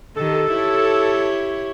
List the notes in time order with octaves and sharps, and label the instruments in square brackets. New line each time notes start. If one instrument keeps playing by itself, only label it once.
[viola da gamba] D#3 G4 [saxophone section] A4
[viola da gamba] E4 G4 C#5